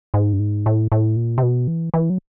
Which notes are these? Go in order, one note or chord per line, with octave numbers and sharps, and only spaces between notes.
G#2
G2
G#2
A2
A2
A#2
C3
B2
E3
E3
F#3